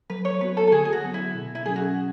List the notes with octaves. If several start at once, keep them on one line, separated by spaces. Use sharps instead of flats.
F#3 B4
C#5
B3 F#4 B4
A4
A4
D3 G#4
G#4
F#4
F#3 B3
E4
B2
E4
F#3 C#4 G#4
F#4